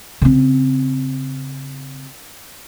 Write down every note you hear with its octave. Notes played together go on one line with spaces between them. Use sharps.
C#3 C4